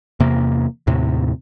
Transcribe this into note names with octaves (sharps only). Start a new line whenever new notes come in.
E2 C3 A#3
D#2 A2 C3